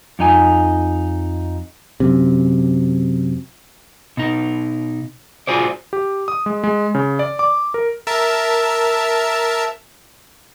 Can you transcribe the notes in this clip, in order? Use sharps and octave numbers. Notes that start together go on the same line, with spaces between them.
F2 D#4 G#5
F#2 C3
B2 D#4
F4 F#4 G#4 C5 D5
G4
D#6
G#3
G#3
C#3
D5
D6
A#4
A#4 E5 A5